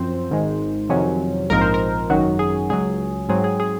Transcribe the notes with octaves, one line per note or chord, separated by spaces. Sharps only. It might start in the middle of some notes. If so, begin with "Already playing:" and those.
Already playing: F#2 F3 C4 C5
G#1 G#2 D#3 G#3
F2 C3 D#3 F#3 C#4
A#1 G#2 F3 C4 D#4 A#4
C5
A#4
G#1 F#2 D#3 F#3 F#4
G#4
C#2 C#3 F#3 G#4
G#2 F#3 C4 G#4
G#4
G#4